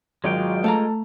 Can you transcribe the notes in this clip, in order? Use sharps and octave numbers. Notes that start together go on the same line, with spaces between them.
G#1 F#3 G#3 F4 G5
A3 A4 F5 A#5